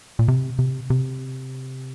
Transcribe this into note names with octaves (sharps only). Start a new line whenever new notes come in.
A#2
C3
C3
C3